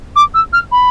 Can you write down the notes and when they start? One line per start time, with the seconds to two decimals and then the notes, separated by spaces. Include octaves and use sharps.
0.16 D6
0.34 E6
0.53 F6
0.71 B5